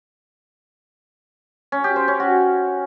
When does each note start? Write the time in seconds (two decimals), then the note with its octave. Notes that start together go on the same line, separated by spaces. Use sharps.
1.72 C#4
1.84 G4
1.96 C5
2.08 C#4
2.20 F#4